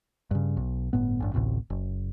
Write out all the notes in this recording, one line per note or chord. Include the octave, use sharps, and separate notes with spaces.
G2 C#3
B1
G1 A2 B3
A1 G2
A1 D2 A2 C3
F#1